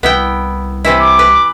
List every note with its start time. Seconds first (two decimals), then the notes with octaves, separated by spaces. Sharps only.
0.03 C2 B3 E4 G5
0.85 C3 E3 E4
1.00 D6
1.19 B4